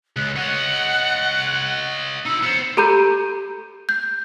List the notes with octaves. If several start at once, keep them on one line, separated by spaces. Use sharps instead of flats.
C#2 F#6
C#5 D#5 F#5
D#4 B5 E6
B3 C5 C#7
G4 A4 A#5 B5 G6
G6